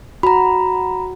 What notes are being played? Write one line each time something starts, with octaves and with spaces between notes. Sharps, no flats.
F#4 A#5 B5